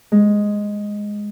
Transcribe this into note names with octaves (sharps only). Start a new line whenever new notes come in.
G#3